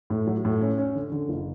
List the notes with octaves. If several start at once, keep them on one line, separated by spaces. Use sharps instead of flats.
A2
F#3
A2
C#4
C#4
D3
D3
F#1